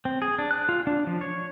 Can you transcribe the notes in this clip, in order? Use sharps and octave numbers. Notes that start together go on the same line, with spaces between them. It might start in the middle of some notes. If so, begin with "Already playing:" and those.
C4
G#4
D4
F#6
F4
D4
F3
C#5